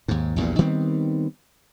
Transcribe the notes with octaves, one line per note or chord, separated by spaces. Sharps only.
D#2 G#2
A#1 E2 G2 A#2
D#3 G3 B3 C4